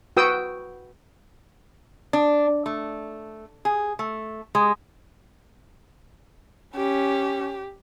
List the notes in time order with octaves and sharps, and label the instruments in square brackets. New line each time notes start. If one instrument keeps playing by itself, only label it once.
[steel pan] F#4 B4 G5 D#6 E6
[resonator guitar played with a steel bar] D4
A3
G#4
A3
G#3
[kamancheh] C#4 [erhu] G4